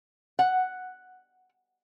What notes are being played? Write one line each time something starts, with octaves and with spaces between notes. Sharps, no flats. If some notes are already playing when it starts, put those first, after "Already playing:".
F#5